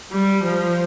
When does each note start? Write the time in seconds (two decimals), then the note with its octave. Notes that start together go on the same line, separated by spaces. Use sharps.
0.12 G3
0.44 F3